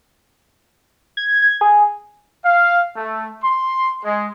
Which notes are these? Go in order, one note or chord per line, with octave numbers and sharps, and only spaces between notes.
G#6
G#6
G#4
F5
A3
C6
G#3